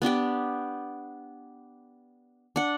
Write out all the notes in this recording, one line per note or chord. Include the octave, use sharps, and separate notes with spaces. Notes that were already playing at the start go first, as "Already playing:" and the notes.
B3 D4 G4 G5
D4 F#5